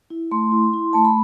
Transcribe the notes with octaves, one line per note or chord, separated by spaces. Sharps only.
E4
A3 C6
E4
E4
A3 A5
B5